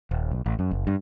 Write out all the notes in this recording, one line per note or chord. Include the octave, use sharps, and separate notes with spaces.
D#1
B1
A1
F#2
F#1
G2